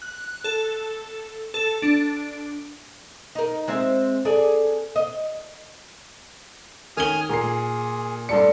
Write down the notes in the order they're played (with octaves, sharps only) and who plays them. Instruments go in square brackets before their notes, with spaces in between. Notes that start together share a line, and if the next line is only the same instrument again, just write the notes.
[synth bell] F#6
A4
A4
D4
[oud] D#4 A#4
G#3 C4 E5
G#4 A4 D5
D#5
[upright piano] D#3 C#4 G7 [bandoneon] G#5 D#6 F6
[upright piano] A#2 C7 [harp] A#3 [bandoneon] G#4
[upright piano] G2 A4 C#7 [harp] D5 C6